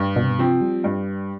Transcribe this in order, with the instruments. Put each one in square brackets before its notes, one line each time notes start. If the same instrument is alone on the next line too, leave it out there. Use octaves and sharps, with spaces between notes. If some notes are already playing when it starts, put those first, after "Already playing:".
Already playing: [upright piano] G2
[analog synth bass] B2
C3
B2
[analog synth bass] C3 [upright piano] F3 C4
[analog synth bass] G3
[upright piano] G2